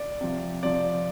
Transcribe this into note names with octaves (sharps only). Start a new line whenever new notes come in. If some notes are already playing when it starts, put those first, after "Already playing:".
Already playing: D5
C3 F3
C3 F3 D5